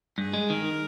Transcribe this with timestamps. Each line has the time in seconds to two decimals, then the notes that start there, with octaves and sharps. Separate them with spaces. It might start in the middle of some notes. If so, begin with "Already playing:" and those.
0.18 G2 G#4
0.34 G#3
0.50 D#3 A#4